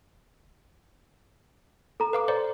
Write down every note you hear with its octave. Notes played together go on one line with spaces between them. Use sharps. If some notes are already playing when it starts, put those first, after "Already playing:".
A4 A#5
B4 F5 D6
C5 D5